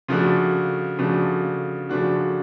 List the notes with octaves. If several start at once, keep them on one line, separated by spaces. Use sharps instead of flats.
C#3 F3 A3 D4 F#4
C#3 F3 A3 D4 F#4
C#3 F3 A3 D4 F#4